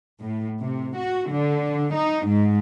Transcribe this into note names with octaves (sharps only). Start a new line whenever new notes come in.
A2
C3
F#4
D3
D#4
G#2